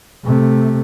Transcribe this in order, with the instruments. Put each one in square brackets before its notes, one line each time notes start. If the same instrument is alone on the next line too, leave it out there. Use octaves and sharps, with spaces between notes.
[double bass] C3 A3